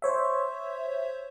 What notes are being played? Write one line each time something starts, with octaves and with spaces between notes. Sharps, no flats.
C5 C#5 E5